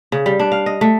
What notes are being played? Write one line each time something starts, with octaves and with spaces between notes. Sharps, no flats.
C#3
G3
D4
F5
D#5
A3